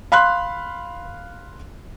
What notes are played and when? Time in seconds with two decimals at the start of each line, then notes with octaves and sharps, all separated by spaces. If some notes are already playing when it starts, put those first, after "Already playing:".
0.12 F5 B5 C6 F#6